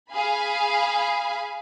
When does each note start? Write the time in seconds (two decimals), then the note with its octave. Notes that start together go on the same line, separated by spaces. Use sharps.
0.12 G#4 F5 G#5 B5